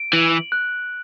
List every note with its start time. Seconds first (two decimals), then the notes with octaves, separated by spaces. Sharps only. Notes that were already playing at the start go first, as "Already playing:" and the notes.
Already playing: D7
0.13 E3 F#7
0.52 F#6